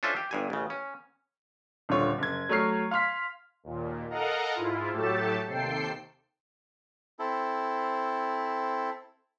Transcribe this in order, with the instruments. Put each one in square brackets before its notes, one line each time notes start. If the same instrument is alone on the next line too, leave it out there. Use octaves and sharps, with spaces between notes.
[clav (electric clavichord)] C#4 D4 F4 A4 C5 E5
G4
G1 G2 G#5
A1 C#3
C#4
[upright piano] D#1 D3 F4 C#5
F#1 G#6
F#3 A3 C#5 F6 C7
F5 C6 F6 B6
[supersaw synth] D#2 A#2
A4 A#4 D#5 F5 F#5 A#5
G#2 E4 F4
A2 F#3 A3 G4 A4 A5
D#2 C3 A4 G5 C7
[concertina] C4 E4 A4